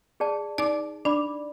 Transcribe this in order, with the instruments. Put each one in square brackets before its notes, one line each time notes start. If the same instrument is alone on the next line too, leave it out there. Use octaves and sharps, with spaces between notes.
[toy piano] G#4 D5 A5
[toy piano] D#4 [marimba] D5 D6
[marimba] D4 [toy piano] D5 B5 D6